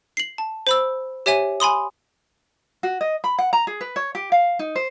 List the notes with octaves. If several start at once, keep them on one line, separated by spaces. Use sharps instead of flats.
C7 F#7
A5
C5 B5 E6
G4 C#5 E5 G#5 D#7
G#5 B5 C6 D#6
F#4
D#5
B5
F#5
A#5
G#4
B4
C#5
G4
F5
D#4
C5